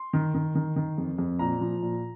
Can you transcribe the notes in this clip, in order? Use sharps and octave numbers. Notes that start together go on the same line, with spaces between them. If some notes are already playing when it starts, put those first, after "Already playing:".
Already playing: C6
D#3
D#3
D#3
D#3
F2
F2
A#2 A#5
F3
A#2